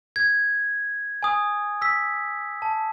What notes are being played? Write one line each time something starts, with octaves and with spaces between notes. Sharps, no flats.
G#6
G#5 D#6
E6 B6
A5